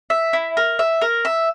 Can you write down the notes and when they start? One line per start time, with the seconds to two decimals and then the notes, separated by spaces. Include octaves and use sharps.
0.10 E5
0.33 E4
0.57 A#4
0.79 E5
1.01 A#4
1.25 E5